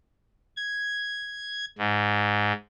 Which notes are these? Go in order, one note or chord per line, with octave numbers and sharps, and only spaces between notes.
G#6
G#2